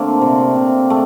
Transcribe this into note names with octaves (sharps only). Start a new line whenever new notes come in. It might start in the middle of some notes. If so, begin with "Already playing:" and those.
Already playing: D3 A3 A#3 C4
C3
C3
A3